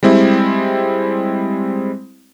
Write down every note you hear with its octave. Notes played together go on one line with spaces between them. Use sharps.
G3 G#3 C4 E4